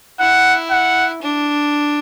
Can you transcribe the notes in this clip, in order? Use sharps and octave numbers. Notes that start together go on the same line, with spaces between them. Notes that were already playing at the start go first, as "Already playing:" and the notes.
E4 F#5
F#5
D4